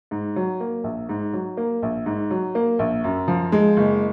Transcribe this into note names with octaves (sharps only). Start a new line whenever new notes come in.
G#2
F#3
A#3
A#1
G#2
F#3
A#3
A#1
G#2
F#3
A#3
A#1
F#2
F3
G#3
F#1